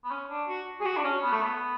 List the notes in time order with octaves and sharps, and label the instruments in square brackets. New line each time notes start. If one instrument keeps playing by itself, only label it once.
[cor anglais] B3
C#4
D4
F#4
G#4
F#4
D4
C#4
B3
A3
B3